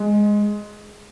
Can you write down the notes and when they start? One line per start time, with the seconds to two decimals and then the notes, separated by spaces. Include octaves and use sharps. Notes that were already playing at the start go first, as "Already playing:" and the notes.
Already playing: G#3